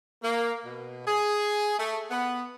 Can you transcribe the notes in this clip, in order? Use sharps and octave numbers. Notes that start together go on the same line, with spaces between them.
A#3
B2
G#4
A3
B3